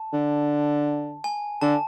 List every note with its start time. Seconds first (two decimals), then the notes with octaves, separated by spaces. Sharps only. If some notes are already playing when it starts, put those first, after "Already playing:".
Already playing: A5
0.13 D3
1.24 G#5
1.61 D3 A5